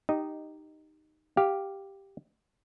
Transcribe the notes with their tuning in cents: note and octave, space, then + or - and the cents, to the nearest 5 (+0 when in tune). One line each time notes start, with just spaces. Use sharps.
D#4 -10 G4 -5 D#5 +0
G4 +0 F5 +0